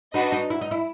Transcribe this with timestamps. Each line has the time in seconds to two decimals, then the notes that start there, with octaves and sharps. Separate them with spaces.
0.14 D4 D#4 F#4 B4 D#5
0.32 D#4
0.50 E4
0.61 D#4
0.71 E4